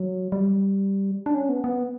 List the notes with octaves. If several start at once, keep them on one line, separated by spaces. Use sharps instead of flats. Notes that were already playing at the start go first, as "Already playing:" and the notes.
Already playing: F#3
G3
D4
C#4
B3
B3